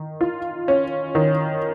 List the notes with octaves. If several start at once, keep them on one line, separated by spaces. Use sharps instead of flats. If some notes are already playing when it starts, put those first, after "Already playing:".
Already playing: D#3
F4
C#4
D#3